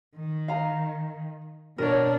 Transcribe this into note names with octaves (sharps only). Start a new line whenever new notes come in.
D#3
F5 A#5
B2 D4 A#4 C#5